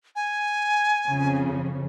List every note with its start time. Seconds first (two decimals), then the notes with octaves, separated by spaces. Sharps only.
0.16 G#5
1.08 F2 C#3